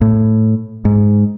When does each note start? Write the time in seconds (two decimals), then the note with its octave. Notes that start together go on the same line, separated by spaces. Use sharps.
0.01 A2
0.85 G#2